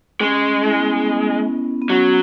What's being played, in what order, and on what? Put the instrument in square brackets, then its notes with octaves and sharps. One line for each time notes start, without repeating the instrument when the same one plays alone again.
[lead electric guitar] G#3 [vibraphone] C#4
[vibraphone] C#4
E4
B3
C#4
B3
B3
[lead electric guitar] F#3 [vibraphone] C#4